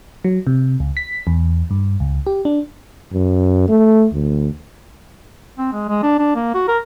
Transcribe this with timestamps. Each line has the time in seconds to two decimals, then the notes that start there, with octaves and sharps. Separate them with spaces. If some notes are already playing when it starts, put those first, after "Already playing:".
0.25 F#3
0.47 C3
0.80 C#2
0.97 B6
1.27 E2
1.71 G2
2.00 C#2
2.27 G4
2.45 D4
3.13 F#2
3.69 A3
4.13 D2
5.58 C4
5.73 G#3
5.89 G#3
6.03 D4
6.19 D4
6.36 A#3
6.54 F#4
6.68 A#4